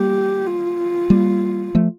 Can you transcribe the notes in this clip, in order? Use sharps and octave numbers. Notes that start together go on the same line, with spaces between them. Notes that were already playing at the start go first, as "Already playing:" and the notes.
Already playing: G3 A#3 G4
F4
G3 A#3
F3 A3